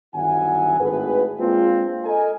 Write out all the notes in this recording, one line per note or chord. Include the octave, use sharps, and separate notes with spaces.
G1 D#3 F#3 E4 F#5 G#5
G#1 A2 G#4 B4
G#3 A#3 C4 D4 F4
A4 A#4 D#5 G#5